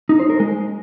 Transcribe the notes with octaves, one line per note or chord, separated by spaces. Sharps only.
D#4
C5
A#4
G#3